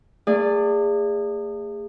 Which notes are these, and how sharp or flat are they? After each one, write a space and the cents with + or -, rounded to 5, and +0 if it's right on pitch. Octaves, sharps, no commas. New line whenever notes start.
A3 +45 G#4 -25 D5 +0